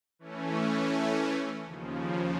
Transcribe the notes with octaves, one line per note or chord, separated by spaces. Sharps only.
E3 A3 C#4
D#2 C#3 F3